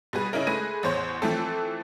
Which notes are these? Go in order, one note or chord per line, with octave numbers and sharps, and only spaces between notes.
B2 G3 G#4 B4
C#3 C#4 D#4 E4 A#4
G#3 A3 G#4 B4 A#6 D#7
A1 E2 C5 C#5
E3 F3 A3 C4 A4